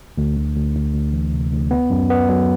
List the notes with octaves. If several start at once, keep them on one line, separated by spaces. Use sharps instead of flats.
D2
D2
D2
D2
D2
E3
C3
D2
B3
F#2
B3
F#3